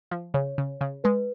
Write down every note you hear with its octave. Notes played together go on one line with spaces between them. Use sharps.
F3
C#3 C#5
C#3
C#3
G#3 B4